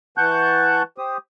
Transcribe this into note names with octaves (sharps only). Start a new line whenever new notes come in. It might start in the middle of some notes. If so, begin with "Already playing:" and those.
E3 F#5 A5 C#6 F#6 G6
G4 C5 D#6